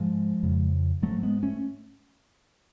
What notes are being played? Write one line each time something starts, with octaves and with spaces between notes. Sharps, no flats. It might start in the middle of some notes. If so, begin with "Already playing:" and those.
Already playing: G#2 F3 G#3
F2 C#3
G#2 F#3 A3
G#3 B3
A3 C#4